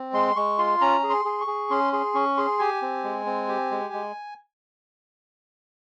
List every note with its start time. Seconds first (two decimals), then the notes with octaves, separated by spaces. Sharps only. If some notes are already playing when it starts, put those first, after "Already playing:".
Already playing: C4
0.13 G#3 C6
0.36 G#3 C#6
0.58 F4 C6
0.81 C#4 A#5
1.03 G#4
1.10 C6
1.25 G#4
1.41 C#6
1.47 G#4
1.70 C#4 C6
1.93 G#4 C6
2.14 C#4 C#6
2.37 G#4 C6
2.59 G4 G#5
2.82 C4
3.04 G#3
3.26 C4
3.48 G4
3.71 G#3
3.94 G#3